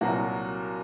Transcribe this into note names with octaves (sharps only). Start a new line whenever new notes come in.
C2 A#2 F#3 F#4